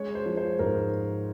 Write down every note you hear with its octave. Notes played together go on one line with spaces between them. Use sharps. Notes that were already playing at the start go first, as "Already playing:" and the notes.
Already playing: G#3 C#5
C5
F3
C5
G#2 A#4